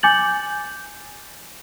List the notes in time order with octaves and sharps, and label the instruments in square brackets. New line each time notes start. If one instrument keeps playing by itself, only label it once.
[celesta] G#5 D6 G6 A6 F#7